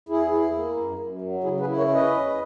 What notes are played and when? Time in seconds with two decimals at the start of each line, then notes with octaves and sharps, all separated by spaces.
0.09 E2 E4 G#4
0.31 E4
0.54 A#3
0.77 F#2
0.99 F#2
1.22 F#3
1.44 C#3 E4 G#4
1.60 G#4 B4
1.66 E4
1.77 A#4 C#5
1.89 C#4
1.94 B4 D#5
2.11 E2